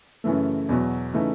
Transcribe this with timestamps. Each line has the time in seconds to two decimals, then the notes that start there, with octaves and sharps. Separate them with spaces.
0.24 F#2 C#3 E3 A3
0.69 E2 B2 F#3
1.14 C#3 E3 A3 D#4